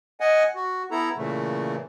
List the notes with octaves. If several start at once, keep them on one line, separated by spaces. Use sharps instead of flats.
D#5 F#5 G#5
F#4
B3 E4 A4 A#5
A#2 C#3 E3 A3